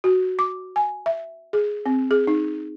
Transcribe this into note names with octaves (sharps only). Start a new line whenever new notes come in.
F#4
D6
G#5
E5
G#4
C4
G#4
D#4